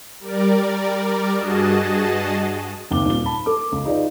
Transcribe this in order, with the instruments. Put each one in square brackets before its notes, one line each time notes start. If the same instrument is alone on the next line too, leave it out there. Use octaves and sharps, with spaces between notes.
[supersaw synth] G3 A#4 D5
G2 F#4 G#4 D#5 A5
[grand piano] F#1 D#2 C4 D6 G7
D#1 A#2 G7
A5 B5
A4 D6
C#2
D#4 F4 G#4 B4 D5